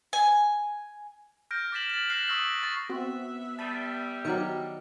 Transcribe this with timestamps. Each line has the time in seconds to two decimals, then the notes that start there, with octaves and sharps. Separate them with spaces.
0.13 G#5
1.51 F6 G6 A#6 D7
1.72 D6 G6 A6 B6 E7 F#7
1.90 A6 F#7
2.10 F6 F#6 A#6 C7 E7 F#7
2.27 C#6 D#6 E6 A#6 B6 F#7
2.63 C#6 A6
2.89 B3 C4 F#4 E5
3.59 G3 A5 B5 D#6
4.25 D#3 F#3 D5 A#5 C#7